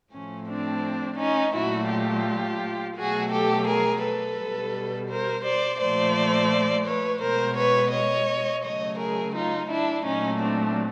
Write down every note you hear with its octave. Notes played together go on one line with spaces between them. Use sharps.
A2 F3 A3 C#4
C4 D4
C#4 D#4
A#2 F#3 A3 E4 F#4
F4 G4
B2 F#3 A3 F#4 G#4
G4 A4
G#4 A#4
A4 B4
B2 G3
A#4 C5
C5 D5
A#2 F3 A3 C5 D5
B4 C#5
B2 G#3 A#4 C5
B4 C#5
C#5 D#5
C#3 F#3 A3 C#5 D#5
G#4 A#4
D#4 F4
D4 E4
A#2 F#3 A3 C#4 D#4
C4 D4